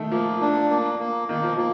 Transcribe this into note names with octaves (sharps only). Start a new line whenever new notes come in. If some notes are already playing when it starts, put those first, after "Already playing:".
Already playing: D#3 A3
F3 A#3
D4
A#3
A#3
D#3 A#3
F3
F3 A#3